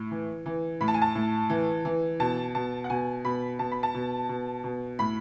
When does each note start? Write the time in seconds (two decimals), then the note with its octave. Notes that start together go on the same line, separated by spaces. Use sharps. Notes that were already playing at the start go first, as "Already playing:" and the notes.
Already playing: A2
0.11 E3
0.46 E3
0.81 A2 B5
0.88 A5
0.94 G#5
1.02 A5
1.15 A2
1.50 E3
1.85 E3
2.20 B2 A5
2.55 B2 A5
2.84 F#5
2.90 B2 G#5
3.25 B2 B5
3.59 B2 A5
3.72 B5
3.83 A5
3.94 B2
4.29 B2
4.64 B2
4.99 A2 B5